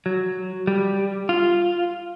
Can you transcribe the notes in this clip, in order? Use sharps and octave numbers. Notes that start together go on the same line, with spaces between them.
F#3
G3
F4